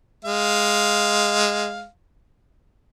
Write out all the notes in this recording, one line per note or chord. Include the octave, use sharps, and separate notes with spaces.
G#3 F5